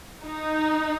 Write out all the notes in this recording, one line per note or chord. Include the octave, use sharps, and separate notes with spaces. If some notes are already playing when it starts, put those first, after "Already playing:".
D#4